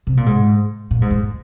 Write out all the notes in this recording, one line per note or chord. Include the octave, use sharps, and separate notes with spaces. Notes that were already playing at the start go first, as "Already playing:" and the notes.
C3
A#2
G#2
A#2
G#2
F2